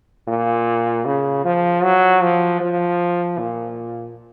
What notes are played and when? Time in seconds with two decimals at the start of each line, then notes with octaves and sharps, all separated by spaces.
0.28 A#2
1.05 C#3
1.45 F3
1.83 F#3
2.22 F3
2.61 F3
3.38 A#2